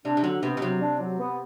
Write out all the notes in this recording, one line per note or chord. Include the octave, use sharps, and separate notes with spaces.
C3 D4
C3
D3 F#3
C3 B3
B2
C3 F#3
D4
F#3
B3